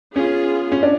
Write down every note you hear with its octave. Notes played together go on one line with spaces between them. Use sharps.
B3 C#4 F4 G#4
C#4
D4